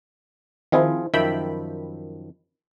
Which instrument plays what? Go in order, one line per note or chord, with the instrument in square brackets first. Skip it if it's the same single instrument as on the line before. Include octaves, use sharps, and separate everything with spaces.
[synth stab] D#3 C4 E4 [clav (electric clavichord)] F3 F4 G#4
[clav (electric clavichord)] F#2 D#3 F3 [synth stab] E5 G5 B5